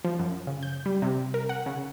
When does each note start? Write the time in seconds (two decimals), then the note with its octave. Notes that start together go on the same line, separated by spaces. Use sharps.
0.05 F3
0.19 F#2
0.47 C#3
0.63 G6
0.86 G3
1.02 C3
1.34 A#4
1.49 F#5
1.66 C#3